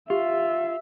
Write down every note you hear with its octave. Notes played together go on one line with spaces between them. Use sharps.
F4 G4 E5